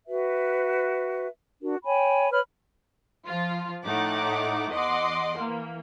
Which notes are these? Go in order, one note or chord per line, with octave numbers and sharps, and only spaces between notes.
F#4 B4 E5
D4 F#4 A#4
C#5 G5 G#5 B5
B4 C#5 B5 F6
F3 F4
A2 A3 D#4 F#5 D6
E2 D#5 F#5 C6 D6
E3 A#3